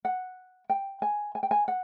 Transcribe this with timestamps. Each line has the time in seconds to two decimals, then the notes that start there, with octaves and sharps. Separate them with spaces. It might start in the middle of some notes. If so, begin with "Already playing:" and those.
0.05 F#5
0.70 G5
1.02 G#5
1.35 G#5
1.43 G5
1.51 G#5
1.68 F#5